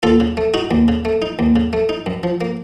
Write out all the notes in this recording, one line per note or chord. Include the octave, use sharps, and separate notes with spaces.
D#2 F4 A4
C#3
A3
D#4 F#4
D#2
C#3
A3
D#4
D#2
C#3
A3
D#4
F#2
F3
A#3